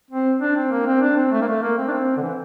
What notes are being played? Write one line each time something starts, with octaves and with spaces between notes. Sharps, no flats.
C4
D4
C4
A#3
C4
D4
C4
A3
A#3
A3
A#3
C4
D4
C4
D3
E3